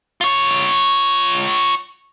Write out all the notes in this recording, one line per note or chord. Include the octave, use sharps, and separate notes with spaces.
F4 C#5